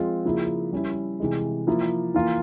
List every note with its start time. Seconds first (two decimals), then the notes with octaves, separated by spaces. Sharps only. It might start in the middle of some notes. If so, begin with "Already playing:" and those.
Already playing: F3 G#3 C4 F4
0.25 C#3 F3 A#3 E4
0.73 G3 C#4 E4
1.20 C3 E3 G#3
1.67 F3 A#3 E4
2.14 E3 A#3 F4